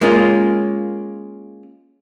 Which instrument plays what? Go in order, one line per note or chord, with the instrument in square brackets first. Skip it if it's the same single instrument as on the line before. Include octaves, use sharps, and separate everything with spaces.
[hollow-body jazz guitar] G#3 A#3 C#4 F4